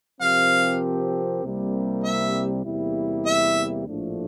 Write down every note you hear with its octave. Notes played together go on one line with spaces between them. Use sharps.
C3 F3 C4 G4 A#4 F5
C2 C3 G3 A#3
E5
E2 C3 G3 A#3 E4
E5
A#1 A2 F3 A3 D4